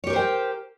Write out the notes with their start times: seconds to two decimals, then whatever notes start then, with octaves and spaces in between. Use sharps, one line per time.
0.04 C#5
0.07 G4
0.10 A#4
0.13 C5
0.16 G5